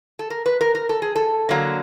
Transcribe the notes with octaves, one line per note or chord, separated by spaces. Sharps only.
A4
A#4
B4
A#4
A#4
A4
G#4
A4
D3 F#3 A#3